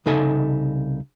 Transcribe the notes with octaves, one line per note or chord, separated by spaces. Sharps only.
C2 C#3 D#4 A4 E5 G#5